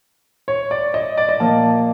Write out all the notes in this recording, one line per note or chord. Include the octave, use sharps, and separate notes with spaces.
C#5
D5
D#5
D5
D#5
A#2 F3 A#3 A5